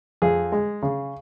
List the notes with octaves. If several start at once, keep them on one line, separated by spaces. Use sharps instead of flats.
F2 G#4
G#3
C#3